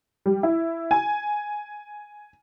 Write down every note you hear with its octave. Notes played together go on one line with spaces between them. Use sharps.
G3
E4
G#5